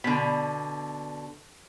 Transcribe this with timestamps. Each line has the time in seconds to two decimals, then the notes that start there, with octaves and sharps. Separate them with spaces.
0.04 B2 D3 B5